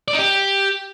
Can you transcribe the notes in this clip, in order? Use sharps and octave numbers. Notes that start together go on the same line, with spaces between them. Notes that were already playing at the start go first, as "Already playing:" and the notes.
D5
D#4
G4